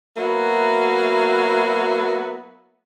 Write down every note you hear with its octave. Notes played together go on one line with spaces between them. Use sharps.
F#3 A#3 B3 E4 F#4 E5